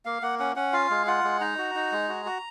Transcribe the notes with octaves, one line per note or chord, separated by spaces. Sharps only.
A#3 F5
A#3 F#5
C#4 F#5
C#4 F#5
F4 F5
G#3
F4 F#5
G#3
D#4 A#5
F#4
D#4
G#3
F#4
F#4